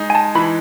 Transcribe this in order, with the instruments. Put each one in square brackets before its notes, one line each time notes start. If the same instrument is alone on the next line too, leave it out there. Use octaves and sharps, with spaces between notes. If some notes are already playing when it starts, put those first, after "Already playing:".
Already playing: [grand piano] G#3 D#4
[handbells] G#5
A5
[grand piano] E3 [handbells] B5